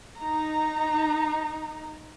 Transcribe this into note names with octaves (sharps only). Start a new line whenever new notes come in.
D#4 A#5